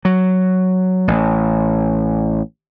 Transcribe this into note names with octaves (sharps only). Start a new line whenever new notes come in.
F#3
A1